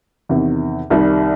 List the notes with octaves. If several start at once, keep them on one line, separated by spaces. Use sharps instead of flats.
E2 C3 D#3
C2 C3 D#3 G3